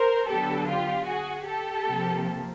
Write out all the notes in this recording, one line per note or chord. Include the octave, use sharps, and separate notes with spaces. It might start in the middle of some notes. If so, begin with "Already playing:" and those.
Already playing: A#4 C5
D3 F#3 B3 G4 A4
F4 G4
F#4 G#4
G4 A4
C3 F3 A#3